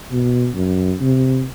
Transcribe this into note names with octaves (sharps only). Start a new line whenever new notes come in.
B2
F#2
C3